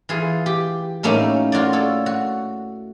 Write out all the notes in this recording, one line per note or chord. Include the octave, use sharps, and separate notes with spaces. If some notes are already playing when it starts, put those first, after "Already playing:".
E3 F4 G#4
G4
A2 A3 A#3 C#4 D#4
F4 F#4 C#5 D5
A4 C#5
F#4